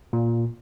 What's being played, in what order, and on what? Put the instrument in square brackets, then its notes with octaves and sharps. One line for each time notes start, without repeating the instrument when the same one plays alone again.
[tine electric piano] A#2